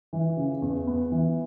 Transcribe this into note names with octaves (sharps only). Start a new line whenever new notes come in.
E3
C#3
E2
B3
E3